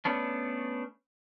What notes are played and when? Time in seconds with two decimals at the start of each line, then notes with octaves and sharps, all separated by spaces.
0.05 A3 B3 C#4 D4